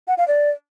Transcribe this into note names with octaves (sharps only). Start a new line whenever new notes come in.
F#5
F5
D5